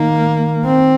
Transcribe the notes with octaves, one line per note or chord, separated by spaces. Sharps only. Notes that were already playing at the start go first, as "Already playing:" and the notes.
Already playing: D#3 A#3
C4